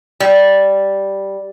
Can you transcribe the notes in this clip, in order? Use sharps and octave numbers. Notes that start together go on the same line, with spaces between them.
G3